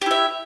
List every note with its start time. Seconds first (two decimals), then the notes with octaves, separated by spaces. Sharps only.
0.02 G4
0.06 E4
0.11 E5